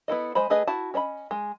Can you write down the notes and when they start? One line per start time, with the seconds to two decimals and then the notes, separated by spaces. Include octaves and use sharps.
0.08 B3 E4 A4 D#5
0.35 G#3 C5 D#5 B5
0.50 A3 G#4 B4 D#5
0.67 E4 F#4 A5
0.94 C#4 C#5 D#5 B5
1.31 G#3